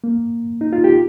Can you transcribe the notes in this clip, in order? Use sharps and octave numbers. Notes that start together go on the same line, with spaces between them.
A#3
D#4
F4
G4